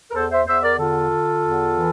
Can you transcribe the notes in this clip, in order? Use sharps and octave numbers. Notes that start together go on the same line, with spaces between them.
A#4
E2 A4 C5
C5 E5
E2 C5 E5
A#4 D5
D3 F4 A4
D3
E2
E3